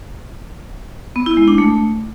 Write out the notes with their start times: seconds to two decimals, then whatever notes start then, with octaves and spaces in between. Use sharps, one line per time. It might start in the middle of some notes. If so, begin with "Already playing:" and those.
1.16 B3
1.26 E4
1.37 G#3
1.48 D4
1.58 A3